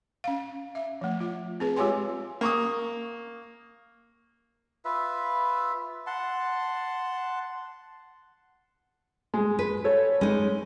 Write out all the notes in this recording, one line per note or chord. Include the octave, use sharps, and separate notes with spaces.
C#4 F5
E5
F3 A3
F4
C4 G#4 B4
G#3 F4 G4 C#5 G#5 C6
A#3 C#6 D#6
F4 B4 E5
F#5 A5 C6
G#3
B4
A4 C#5
G#3 C#4 D#4